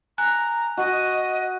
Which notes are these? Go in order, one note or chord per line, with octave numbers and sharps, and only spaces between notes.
G#5 A#5 F#6
F#4 D#5